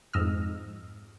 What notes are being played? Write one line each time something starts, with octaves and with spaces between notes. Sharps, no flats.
F2 G#2 D#5 E6 F6